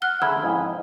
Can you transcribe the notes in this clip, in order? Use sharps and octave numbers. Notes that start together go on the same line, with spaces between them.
F#5 F6 F#6 G7
D3 C#4 G#4 E5 B5 E6 G#6
F2 G#2 E4 G5 D#6